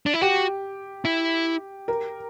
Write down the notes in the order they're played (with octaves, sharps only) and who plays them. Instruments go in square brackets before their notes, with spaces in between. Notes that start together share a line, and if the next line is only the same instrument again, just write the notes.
[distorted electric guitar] D4
E4
[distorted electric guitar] F#4 [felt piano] G4
[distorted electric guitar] E4
[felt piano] A#4